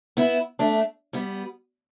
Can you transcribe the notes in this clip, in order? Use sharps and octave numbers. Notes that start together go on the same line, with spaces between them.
B3 E4
A3 D4
G3 B3